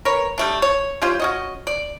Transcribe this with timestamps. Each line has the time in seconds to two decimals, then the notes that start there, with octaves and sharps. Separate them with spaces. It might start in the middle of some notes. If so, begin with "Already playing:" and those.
0.05 A#4 B4 C#5
0.38 G3 A3 D4
0.62 C#5
1.02 G3 C#4 F4 C5
1.20 C#4 F#4 D#5
1.67 D5